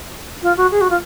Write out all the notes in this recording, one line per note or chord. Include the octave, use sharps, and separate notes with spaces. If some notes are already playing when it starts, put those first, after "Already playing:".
F4
F#4
G#4
F#4
F4